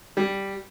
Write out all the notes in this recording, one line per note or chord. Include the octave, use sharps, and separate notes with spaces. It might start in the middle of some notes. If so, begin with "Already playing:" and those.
G3